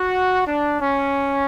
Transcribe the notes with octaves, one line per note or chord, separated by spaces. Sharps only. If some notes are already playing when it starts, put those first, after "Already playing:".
Already playing: F#4
D4
C#4